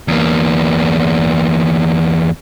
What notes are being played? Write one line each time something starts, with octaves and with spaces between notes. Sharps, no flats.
E2 A#3